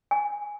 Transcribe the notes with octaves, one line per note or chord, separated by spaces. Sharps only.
G#5